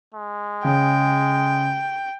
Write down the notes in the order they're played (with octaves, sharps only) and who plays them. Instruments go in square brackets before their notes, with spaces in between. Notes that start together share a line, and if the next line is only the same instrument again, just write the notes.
[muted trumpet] G#3
[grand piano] C#3 [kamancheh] G5